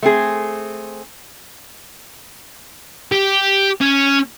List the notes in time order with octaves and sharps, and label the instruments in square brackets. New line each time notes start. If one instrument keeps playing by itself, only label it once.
[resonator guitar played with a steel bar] A3 C4 G#4
[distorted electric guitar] G4
C#4